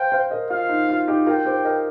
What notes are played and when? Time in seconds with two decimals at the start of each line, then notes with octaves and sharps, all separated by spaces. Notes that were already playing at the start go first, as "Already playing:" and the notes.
Already playing: C5 F5 G5
0.12 C5 F5
0.31 A#4 D#5
0.50 F4 F5
0.69 D#4
0.89 F4
1.08 D#4 G4
1.27 F4 A#4 G5
1.45 G4 C5
1.65 A#4 D#5